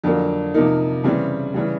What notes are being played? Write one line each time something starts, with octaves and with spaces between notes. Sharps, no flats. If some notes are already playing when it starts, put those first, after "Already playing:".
F2 D3 F#3 A#3
C3 F3 A#3 D#4
C#3 E3 G3 C4
C#3 E3 G3